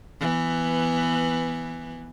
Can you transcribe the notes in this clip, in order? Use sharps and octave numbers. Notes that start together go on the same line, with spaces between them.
E3 B3